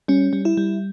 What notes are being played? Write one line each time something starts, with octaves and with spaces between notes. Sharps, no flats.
G3 C#4
G3
E4
G3